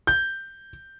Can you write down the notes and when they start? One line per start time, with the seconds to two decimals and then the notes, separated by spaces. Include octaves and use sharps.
0.07 G6